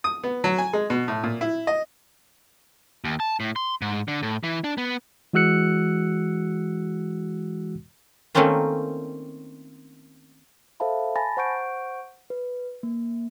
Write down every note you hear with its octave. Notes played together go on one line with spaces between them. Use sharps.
D#6
B3
F#3
G#5
G#3
B2
A2
A#2
E4
D#5
D#2
A5
A2
C6
G#2
D3
A2
E3
D4
B3
E3 G#3 F#4 E6 F#6 C#7
D#3 A3 A#3 C4 C#4 F4
A4 C5 E5 F5 A5 B5
G#5 A5 B5 A6 A#6
C5 F#5 C#6 G6 D7
B4
A#3